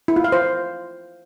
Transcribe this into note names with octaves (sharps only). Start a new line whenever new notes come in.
E4
F4
F5
C5